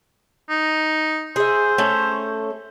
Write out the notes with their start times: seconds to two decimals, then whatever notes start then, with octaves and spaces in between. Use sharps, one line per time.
0.50 D#4
1.36 G#4 C5 E5
1.78 A3 C#4 A4